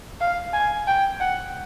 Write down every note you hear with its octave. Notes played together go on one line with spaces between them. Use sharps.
F5
G#5
G5
F#5